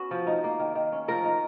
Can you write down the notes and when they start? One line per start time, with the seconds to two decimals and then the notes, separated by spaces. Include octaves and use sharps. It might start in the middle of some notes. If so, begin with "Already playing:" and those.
Already playing: B3 C#4 F#4
0.11 F3
0.27 D#4
0.44 A#3
0.60 D#3
0.75 D#3
0.92 C#4
1.08 F3 A#4
1.24 D#4